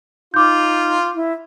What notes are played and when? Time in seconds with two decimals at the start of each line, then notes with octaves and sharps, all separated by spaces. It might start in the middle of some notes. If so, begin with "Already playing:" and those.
0.34 D#4 F4 D6 G6
1.15 E4